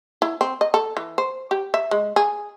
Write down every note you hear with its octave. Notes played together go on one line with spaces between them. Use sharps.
E4
C4
D#5
A4
E3
C5
G4
E5
G#3
G#4